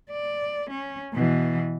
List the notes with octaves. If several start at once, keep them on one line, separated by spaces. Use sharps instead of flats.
D5
C#4
B2 E3